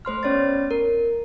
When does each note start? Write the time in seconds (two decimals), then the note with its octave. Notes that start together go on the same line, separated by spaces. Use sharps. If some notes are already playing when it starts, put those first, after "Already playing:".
0.05 A3 C5 C6 F6
0.23 B3 C#4 C#5 D5 B5 A6
0.71 A#4